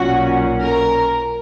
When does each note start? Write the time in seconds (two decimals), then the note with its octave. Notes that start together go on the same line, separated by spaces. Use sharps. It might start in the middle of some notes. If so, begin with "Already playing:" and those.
Already playing: B1 A#2 F#3 C#4 F#4
0.60 A#4